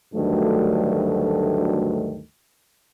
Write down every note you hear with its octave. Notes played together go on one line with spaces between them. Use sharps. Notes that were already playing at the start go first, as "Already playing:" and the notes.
D2 G2 D#3 F#3 A3